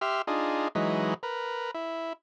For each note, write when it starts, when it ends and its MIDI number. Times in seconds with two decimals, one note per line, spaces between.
0.01 0.22 67
0.01 0.22 76
0.01 0.22 84
0.01 0.22 89
0.27 0.68 62
0.27 0.68 63
0.27 0.68 65
0.27 0.68 68
0.75 1.14 52
0.75 1.14 54
0.75 1.14 56
0.75 1.14 63
0.75 1.14 71
1.23 1.71 70
1.23 1.71 71
1.74 2.13 64